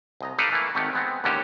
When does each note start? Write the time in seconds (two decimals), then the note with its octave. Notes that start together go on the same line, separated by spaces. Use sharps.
0.21 C2 D#5 A#5
0.38 D#4 A4 B4 D5 D#5 F5
0.52 E3 A3 A#3 E4
0.75 G#1 D#3 A3 G4 F#5
0.93 G#3 B3 C4
1.24 D#2 G#2 D3 C#4 F#4 G4